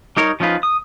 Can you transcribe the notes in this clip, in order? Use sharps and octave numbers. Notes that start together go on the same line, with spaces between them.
G3 D#4 A#4 C#5
F3 C#4 D#4 F4 B4
D#6